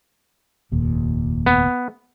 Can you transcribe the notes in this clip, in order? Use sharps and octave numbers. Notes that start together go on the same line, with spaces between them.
F1 D#2 A#2
B3